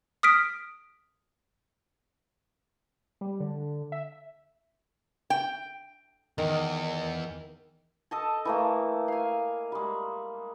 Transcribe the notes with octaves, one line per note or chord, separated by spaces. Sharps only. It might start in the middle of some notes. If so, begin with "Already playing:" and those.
D#6 F6 B6 D7
G3
D3
E5
G5
E2 D#3
A4 D#5 A5
E3 A3 A#3
F5 G#5
G3 G#3